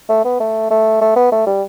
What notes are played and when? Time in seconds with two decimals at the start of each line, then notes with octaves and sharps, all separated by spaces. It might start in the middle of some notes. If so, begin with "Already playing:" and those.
0.09 A3
0.25 B3
0.40 A3
0.71 A3
1.01 A3
1.16 B3
1.32 A3
1.46 G3